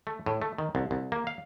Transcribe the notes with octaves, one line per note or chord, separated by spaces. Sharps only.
A3
A2
A3
D#3
C2
C2
A#3
F5